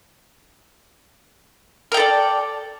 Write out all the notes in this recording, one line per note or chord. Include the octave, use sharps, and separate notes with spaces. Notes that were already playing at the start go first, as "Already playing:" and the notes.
A4 A#4 D5 G5